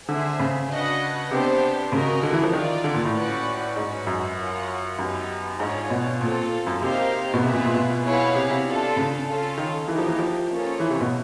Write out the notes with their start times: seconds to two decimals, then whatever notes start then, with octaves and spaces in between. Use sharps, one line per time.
0.09 D3 G#4 C5 E5
0.40 C#3
0.70 D4 F#4 B4 D#5 F#5
1.31 C3 B3 D4 G4 C5
1.92 C#3 F#4 A#4 D#5
2.23 D3
2.33 E3
2.44 F3
2.53 D#3 F4 A#4 D5
2.84 D3
2.94 A#2
3.05 A2
3.15 C#4 F#4 B4 D5 F#5
3.76 G#2 C#4 F#4 B4
4.07 F#2
4.38 F4 A#4 C#5 F#5
4.98 F#2 B3 D#4 G4 B4
5.59 G#2 D4 F4 G#4 C#5
5.90 B2
6.21 A#2 C4 F4 A4
6.67 F#2
6.82 C3 A#3 D#4 G4 C5 F5
7.34 B2
7.43 C3 F4 G#4 B4 E5
7.53 B2
7.64 A#2
7.74 B2
8.04 B3 E4 G#4 C#5 F5
8.35 C3
8.50 C3
8.66 D4 F4 A4
8.96 C#3
9.27 C#4 F4 A4
9.58 D#3
9.88 E3 A#3 D#4 G4
9.99 F3
10.08 E3
10.19 F3
10.49 A#3 C#4 F4 A4 C#5
10.80 E3
10.90 C3
11.01 B2